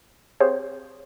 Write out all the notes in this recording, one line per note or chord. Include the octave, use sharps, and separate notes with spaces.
C4 G4 G#4 C5 C#5 F5